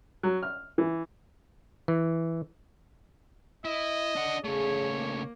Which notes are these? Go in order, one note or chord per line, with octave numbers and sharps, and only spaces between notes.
F#3
F6
E3
E3
E4 D#5
D4 F#5
C#3 A3 G#4 C#5
A#3